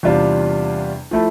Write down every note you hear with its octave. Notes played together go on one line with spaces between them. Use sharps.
E2 C3 G3 D4 F4
F3 A3 E4 A4